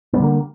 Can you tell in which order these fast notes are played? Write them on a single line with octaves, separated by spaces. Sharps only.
B3 G3 D3 A#3